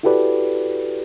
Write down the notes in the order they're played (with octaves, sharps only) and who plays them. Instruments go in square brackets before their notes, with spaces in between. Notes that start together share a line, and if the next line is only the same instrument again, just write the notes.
[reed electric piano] E4 F#4 G4 A4 B4 D5